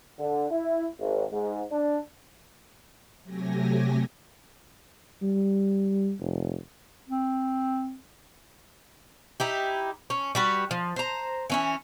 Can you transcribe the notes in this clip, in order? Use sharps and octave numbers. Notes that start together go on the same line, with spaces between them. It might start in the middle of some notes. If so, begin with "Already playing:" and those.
D3
E4
G#1
G#2
D4
C3 F#3 A3 G4 G#5 A#6
G3
F1
C4
D#4 E4 G4
C#4
G3 F#4 B4
F3
C5 A#5
E3 C#4 E4